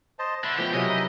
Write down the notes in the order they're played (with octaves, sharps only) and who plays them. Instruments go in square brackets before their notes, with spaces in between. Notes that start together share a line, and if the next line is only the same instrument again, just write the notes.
[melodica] C5 D#5 A5
[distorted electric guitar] D3 [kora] E5 [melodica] B5
[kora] F3 B3 C#4 [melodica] E4 [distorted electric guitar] G4
[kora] C3 F#3 A#4 [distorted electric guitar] D#5 [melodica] G#5 D#6
[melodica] D#4 E4 E5